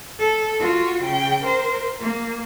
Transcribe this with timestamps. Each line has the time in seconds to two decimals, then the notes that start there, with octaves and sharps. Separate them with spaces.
0.19 A4
0.59 F4 F#4
1.03 C#3 G5
1.44 A#4 C5
2.00 A#3